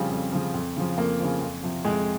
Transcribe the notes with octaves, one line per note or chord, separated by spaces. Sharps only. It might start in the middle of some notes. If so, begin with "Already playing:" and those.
Already playing: F2 C#3 F3 G3
F2
C#3 F3
F2
C#3 F3
F2 A#3
C#3 F3
F2
C3 F3
F2 G#3